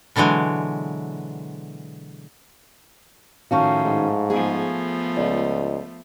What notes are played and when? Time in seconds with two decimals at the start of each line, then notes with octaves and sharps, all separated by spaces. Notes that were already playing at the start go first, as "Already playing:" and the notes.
0.16 B2 D3 E3 F#3 G#3
3.51 A2 D#3 F3 C#4 F#4 F5 A5 C#6
3.83 G#2
4.30 F3 A3 B3 G#4
5.16 C#2 D5 D#5